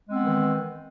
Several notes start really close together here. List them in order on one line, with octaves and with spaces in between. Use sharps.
G#3 C4 B3 E3 D#3